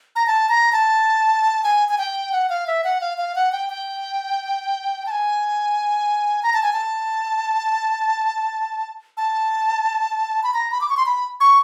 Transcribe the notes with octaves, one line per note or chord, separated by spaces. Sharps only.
A#5
A5
A#5
A5
G#5
G#5
G5
F#5
F5
E5
F#5
F5
F5
F#5
G5
G5
A5
G#5
A#5
A5
G#5
A5
A5
B5
A#5
B5
D6
C#6
C6
B5
C#6